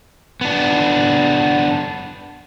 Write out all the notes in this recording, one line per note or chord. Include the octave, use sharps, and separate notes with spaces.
B3 D4